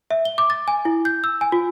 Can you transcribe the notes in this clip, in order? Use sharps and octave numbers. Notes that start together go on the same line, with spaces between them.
E5
G7
D6
A6
G#5
E4
G6
E6
G#5
F4